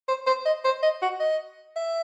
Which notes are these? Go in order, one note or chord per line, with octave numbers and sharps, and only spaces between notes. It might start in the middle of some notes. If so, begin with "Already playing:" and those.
C5
C5
D#5
C5
D#5
F#4
D#5
E5